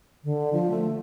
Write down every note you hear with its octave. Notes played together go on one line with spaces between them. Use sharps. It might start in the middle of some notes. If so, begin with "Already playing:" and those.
D3
F3
A3